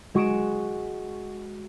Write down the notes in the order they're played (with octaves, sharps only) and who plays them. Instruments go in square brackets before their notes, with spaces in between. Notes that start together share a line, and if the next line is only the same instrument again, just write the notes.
[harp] G#3 F#4 C#6 D#6 D7 E7